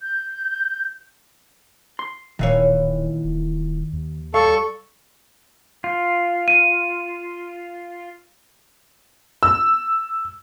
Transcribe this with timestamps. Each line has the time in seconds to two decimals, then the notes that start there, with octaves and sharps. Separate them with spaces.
0.01 G6
1.99 C6
2.39 D1 A#2 D#3 E3 C#5 F5
3.24 D#1
3.92 D#2
4.34 G3 A4 F5 C#6
5.84 F4
6.48 D#7
9.43 E6